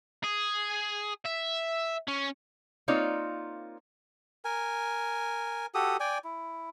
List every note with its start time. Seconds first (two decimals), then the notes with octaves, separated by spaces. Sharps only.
0.23 G#4
1.25 E5
2.08 C#4
2.88 A#3 C4 D#4 F4 C#5 D5
4.45 A#4 G#5
5.75 F#4 G4 A4 D#6
6.00 D5 G5 G#5
6.24 E4